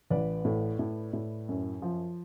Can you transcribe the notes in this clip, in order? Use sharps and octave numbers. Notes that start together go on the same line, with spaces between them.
A1 B4 D5
A2
A2
A2
F#2
F3